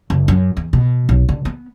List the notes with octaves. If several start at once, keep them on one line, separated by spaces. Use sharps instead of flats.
F#1
F#2
E2
B2
B1
D3
B3